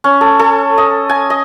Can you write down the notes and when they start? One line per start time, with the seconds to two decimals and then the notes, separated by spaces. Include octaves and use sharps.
0.04 C#4
0.21 A4
0.39 A4
0.78 D#5
1.09 G#5
1.30 D#5